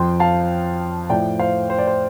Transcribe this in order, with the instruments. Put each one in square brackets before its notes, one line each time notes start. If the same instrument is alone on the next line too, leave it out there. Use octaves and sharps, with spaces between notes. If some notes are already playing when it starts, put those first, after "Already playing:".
Already playing: [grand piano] F2 F3 G5 C6
F5 A5
A2 F3 D5 G5
C5 F5
C5
D5
C5